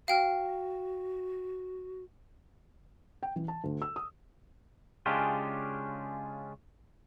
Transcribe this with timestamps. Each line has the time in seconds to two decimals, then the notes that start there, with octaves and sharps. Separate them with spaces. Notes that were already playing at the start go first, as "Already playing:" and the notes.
0.08 F#4 F5 G5 F6
3.23 G5
3.36 E3
3.48 A5
3.64 D2
3.82 E6
3.96 D#6
5.06 C#3 G#3 C#4 D4 F4 G4